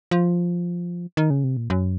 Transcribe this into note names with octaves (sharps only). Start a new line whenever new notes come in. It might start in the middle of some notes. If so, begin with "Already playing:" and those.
F3
D#3
C#3
C3
A#2
F#2